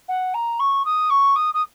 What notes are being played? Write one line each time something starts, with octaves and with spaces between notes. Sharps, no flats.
F#5
A#5
C#6
D#6
C#6
D#6
D#6